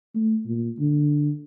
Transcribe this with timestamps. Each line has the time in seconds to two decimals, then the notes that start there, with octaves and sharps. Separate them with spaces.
0.15 A3
0.46 A#2
0.79 D3